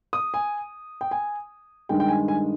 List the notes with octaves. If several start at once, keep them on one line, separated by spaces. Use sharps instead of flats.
D#6
G#5
G5
G#5
G2 D#3 G#3 G5
G5
G#5
G#5